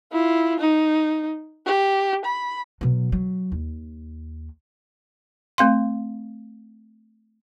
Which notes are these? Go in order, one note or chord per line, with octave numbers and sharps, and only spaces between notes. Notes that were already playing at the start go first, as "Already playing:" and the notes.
E4 F4
D#4
G4
B5
B2 F#3
F#3
D#2
A3 C4 F5 C6